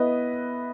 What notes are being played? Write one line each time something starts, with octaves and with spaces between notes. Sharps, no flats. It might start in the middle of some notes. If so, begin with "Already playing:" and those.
Already playing: B3 E4 B4 D#5